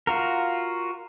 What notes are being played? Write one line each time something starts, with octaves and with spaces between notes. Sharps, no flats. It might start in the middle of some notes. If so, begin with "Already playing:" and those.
F4 F#4 A#4